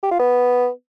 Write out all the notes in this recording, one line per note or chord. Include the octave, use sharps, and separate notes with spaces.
G4
F4
B3